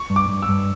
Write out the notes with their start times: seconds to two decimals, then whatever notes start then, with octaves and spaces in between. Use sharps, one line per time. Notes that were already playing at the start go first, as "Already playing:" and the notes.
Already playing: C#6
0.10 G2
0.16 D6
0.29 G2
0.42 E6
0.49 G2